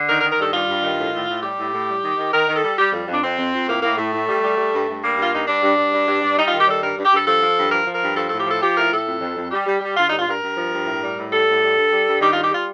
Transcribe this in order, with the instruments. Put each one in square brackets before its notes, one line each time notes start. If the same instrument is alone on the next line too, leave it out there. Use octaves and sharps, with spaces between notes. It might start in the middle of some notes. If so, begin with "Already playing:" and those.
Already playing: [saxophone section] D3
D#3 A#4
A#4
D#3
A#4
G2 A4
G3 F4
G2
D#3
A2
A2
A2
G3 G4
A2
A2
G3
D#3
D#3
D#3 A#4
D#3
A4
G3
G3 G4
F2
F2 D4
F2 C4
F2
F2
A2 A#3
A2 A#3
A2 A3
A2
G3
G3
G3
G2
G2
G3 A#3
G2 F4
G2 D#4
G2 D4
G2
G2
G2
G2
G2
G3 D#4
D#3 F4
G4
G3 A4
G2 A#4
G2
G4
G2 A4
F3 A4
F3
G2
F3 A#4
F3
A#4
G2
F3 A4
A2 A4
G4
F3 A4
F3 G4
A2 A#4
A2 A4
F2
F2
F2
G3 G4
G3
G3
D3 F4
G2 D#4
F4
G2 A#4
G2
F3
G2
A2
G3
A2
G3 A4
A2
G3
G2
G3
G2
D#3 G4
G3 F4
G4
G3 F4